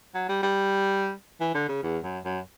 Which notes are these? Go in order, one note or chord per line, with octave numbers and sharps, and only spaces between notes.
F#3
G3
G3
E3
D3
C#3
E2
F#2
F#2